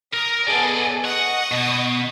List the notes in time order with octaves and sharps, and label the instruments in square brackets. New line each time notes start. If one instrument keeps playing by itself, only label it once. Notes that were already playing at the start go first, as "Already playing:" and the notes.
[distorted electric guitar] A#4 [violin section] D#6
[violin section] B3 G#4 A4 [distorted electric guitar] D5 D#5
[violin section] D#5 C#6 D#6 [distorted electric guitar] F#5
[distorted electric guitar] B2